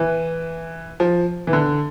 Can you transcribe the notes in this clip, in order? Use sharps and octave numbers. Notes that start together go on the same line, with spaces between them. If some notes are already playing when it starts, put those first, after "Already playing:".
Already playing: E3
F3
E3
D3